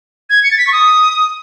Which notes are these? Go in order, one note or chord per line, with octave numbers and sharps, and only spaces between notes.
G#6
C#7
A6
B6
C#6
D#6